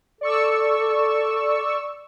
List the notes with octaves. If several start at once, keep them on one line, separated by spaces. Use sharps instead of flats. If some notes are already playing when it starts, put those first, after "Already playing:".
A4 D5 C#6 E6